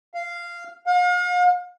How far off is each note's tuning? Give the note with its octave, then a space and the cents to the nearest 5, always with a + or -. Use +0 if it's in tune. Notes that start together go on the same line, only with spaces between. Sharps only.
F5 -10
F5 +40